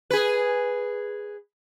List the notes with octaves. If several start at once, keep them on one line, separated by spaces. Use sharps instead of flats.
G#4 B4